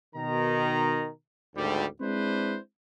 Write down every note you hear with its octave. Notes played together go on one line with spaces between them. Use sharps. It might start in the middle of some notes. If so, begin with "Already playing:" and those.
B2 D#3 A#5
G#1 D2 G3
G#3 C4 D4 E4 B4 C5